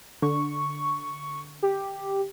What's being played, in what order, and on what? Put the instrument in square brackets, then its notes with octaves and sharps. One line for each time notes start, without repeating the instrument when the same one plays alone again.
[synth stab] D3 [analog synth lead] C#6
[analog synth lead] G4